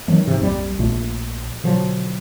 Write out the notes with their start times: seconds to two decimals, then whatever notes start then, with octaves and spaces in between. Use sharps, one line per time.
0.08 D#3 E3 F#3 A3
0.27 G#2 C3
0.40 A#1 F2 G3
0.79 A#1 A#2 A3
1.64 B2 D3 F3 F#3